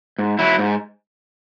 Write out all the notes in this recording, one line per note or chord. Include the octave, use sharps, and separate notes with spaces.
G#2
F#3 E4
G#2